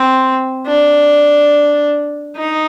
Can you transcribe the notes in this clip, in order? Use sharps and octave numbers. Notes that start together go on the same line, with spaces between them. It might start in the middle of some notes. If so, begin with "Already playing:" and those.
Already playing: C4
D4
D#4